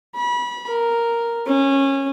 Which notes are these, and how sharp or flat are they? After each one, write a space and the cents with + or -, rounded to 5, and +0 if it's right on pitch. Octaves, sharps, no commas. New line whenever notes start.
B5 -30
A#4 +0
C#4 -20